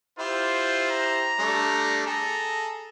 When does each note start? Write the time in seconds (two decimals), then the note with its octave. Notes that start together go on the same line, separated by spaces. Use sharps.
0.19 E4 F4 G4 C5
0.91 A#5
1.39 G3 A3 D4
2.07 G#4 A4 A#5